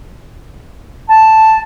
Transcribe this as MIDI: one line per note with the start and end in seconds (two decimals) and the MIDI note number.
1.09 1.61 81